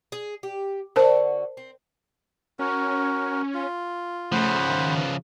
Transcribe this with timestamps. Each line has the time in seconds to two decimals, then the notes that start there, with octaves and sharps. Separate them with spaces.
0.12 G#4
0.43 G4
0.96 D3 F#4 A#4 C5 A5
1.57 C4
2.59 C#4 F#4 A#4
3.54 F4
4.32 C#3 F3 A3 C5 F#5 B5
4.69 D#3
4.98 B4